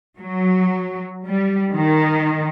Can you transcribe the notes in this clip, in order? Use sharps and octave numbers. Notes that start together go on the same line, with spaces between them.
F#3
G3
D#3